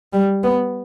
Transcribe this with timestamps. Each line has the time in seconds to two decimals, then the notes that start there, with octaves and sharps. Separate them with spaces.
0.13 G3
0.44 B3